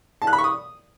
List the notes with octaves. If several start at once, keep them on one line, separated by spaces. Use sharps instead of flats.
A5
F#6
B5
C#6
D#6